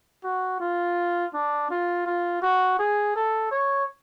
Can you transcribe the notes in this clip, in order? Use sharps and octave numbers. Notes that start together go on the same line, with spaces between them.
F#4
F4
D4
F4
F4
F#4
G#4
A4
C#5